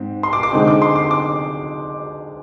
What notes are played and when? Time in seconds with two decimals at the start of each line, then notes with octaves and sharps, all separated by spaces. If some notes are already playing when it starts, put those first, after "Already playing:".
Already playing: G#2 C4
0.23 C6
0.33 D6
0.43 D6
0.53 D3 G#3 C4 D#4
0.67 D6
0.82 C6
0.96 D6
1.11 D6